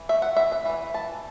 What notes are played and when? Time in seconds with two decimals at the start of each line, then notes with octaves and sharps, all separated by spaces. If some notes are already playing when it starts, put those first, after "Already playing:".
Already playing: E3
0.09 A3 E5
0.22 F#5
0.37 E3 E5
0.52 E5
0.65 E3
0.94 E3 A5